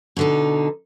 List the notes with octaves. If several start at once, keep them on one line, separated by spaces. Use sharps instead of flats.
B2 D3 D#4